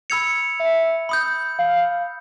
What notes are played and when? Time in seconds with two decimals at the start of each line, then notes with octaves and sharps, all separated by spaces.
0.10 B5 E6 G#6 C#7 F7
0.60 E5
1.09 B5 D#6 G6
1.59 F5